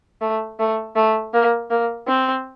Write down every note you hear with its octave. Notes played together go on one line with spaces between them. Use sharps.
A3
A3
A3
A#3
A#3
C4